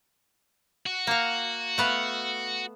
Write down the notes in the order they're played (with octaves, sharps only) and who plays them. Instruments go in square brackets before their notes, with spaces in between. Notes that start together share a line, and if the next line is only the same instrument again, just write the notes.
[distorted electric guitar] F#4
[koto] A#3 F5
A3 B3 F5